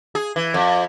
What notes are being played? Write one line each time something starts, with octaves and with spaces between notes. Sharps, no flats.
G#4
E3
F2